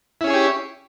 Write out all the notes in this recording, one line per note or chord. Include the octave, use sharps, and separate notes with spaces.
C#4 E4 G4 G#4 C#5